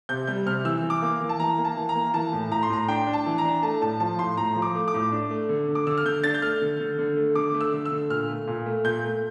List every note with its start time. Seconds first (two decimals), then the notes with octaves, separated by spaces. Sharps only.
0.09 C3 G6
0.27 G3 G6
0.46 C3 F6
0.65 E3 E6
0.83 E3
0.90 D6
1.02 A#3
1.21 E3
1.29 A5
1.40 E3 A#5
1.58 A#3
1.65 A5
1.77 E3
1.89 A#5
1.96 A#3
2.14 E3 A5
2.33 A2
2.51 A2 A#5
2.63 C6
2.70 A2 A#5
2.88 D4 G5
3.07 D4
3.13 A5
3.26 E3
3.38 A#5
3.45 D4
3.63 A3 A5
3.81 A2 A5
4.00 F3 A5
4.19 A2 C6
4.37 A2 A#5
4.56 F3
4.62 D6
4.75 A3
4.88 D6
4.94 A2
5.12 D4
5.31 A3
5.49 D3
5.68 D3
5.75 D6
5.87 D3 E6
5.98 F6
6.06 D3 G6
6.24 D4 A6
6.34 G6
6.42 A3 F6
6.61 D3
6.80 D3
6.99 D3
7.17 A3
7.35 D3 D6
7.54 A3
7.61 E6
7.73 D3
7.85 E6
7.92 D3
8.10 A#2 F6
8.28 A3
8.47 A#2
8.66 A3
8.84 A#2 G6
9.04 A3